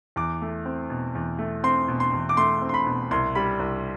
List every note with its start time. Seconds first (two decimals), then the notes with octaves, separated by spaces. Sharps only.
0.16 E2 D6
0.42 A3
0.65 C4
0.90 B2
1.15 E2
1.39 A3
1.64 C4 C6
1.88 B2
2.00 C6
2.13 E2
2.29 D6
2.37 A3 C6
2.62 C4
2.69 C6
2.74 B5
2.87 B2
3.11 C2 C6
3.35 G3 B5
3.60 C2